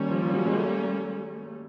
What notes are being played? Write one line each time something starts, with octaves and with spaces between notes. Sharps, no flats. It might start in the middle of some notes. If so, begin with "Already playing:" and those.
Already playing: D#3 G3 A#3 C#4
F3
F3
F#3
G#3
A3